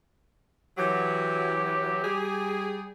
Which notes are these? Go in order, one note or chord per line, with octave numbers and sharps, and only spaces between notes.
E3 F#3 G4
G3 G#4